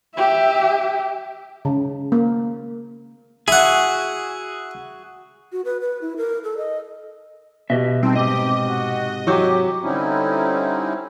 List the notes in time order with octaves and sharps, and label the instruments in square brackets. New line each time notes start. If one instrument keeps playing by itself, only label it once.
[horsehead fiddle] G4 E5
[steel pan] C#3
A#3
[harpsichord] E4 F#5 [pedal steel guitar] F#4 G#4
[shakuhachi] F#4
B4
B4
E4
A#4
A4
D#5
[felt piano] B2 [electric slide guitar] G4 D#5 E5
[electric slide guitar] G3 D#4 G5 [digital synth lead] C4 [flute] A5
[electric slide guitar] G#2 C3 C4 [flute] G4 [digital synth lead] D#5
[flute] F#4
[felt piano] F#3 C#6 G6 [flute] G4
[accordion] D3 G3 C4 C#4 D#4 E4